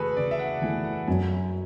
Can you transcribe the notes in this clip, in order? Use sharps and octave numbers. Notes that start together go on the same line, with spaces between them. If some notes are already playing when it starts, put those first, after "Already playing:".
Already playing: C#3 E3 A3 E4 F#4 G#4 A4 B4
C#3 D5
E5
F#5
E3 A3 E4 G#5
F#5
F#2 G#5